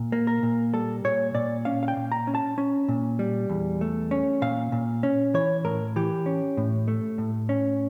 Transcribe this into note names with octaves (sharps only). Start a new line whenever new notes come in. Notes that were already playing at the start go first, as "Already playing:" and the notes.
Already playing: A#2
A#3
A#4
A#2
G3 A4
A#2 C#5
A#2 D5
C#4 F5
F5
G5
A#2
A#5
C#4
A5
C#4
A#2
G3
E2
A3
C#4
A#2 F5
A#2
C#4
E3 C#5
A2 A#4
E3 G4
C#4
A2
A3
A2
C#4